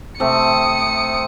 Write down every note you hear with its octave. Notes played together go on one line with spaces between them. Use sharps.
C3 A3 C4 D#6 C#7